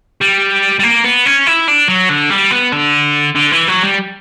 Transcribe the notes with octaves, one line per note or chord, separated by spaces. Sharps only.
G3
G3
A#3
B3
C#4
E4
D4
F#3
D3
G3
B3
D3
D3
E3
F#3
G3